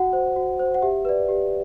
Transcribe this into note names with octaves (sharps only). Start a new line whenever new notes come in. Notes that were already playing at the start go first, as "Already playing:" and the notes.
Already playing: F#4 F#5
C5
F#4
C5
F#5
G4 E5
B4 D5
G4